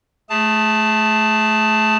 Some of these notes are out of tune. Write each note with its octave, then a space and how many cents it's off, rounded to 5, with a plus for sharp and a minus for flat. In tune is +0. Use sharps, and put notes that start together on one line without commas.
A3 -20 G#4 +0 A5 +0